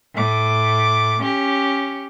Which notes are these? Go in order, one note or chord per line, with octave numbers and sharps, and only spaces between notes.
A2 D6
C#4 G4